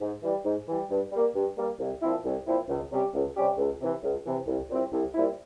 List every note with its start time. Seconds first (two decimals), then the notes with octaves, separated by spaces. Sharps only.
0.01 G#2
0.23 E3 G3
0.45 G#2
0.68 E3 G3
0.90 G2
1.12 G3 A#3
1.35 G2
1.57 G3 A#3
1.79 C2
2.02 A#2 F3 C4 E4
2.25 C2
2.46 A#2 F3 C4 E4
2.69 C#2
2.91 C3 G3 C#4 G4
3.14 C#2
3.36 C3 G3 C#4 G4
3.58 C#2
3.81 C3 E3
4.03 C#2
4.25 C3 E3
4.47 C2
4.70 A#2 G3 C4 E4
4.92 C2
5.15 A#2 G3 C4 E4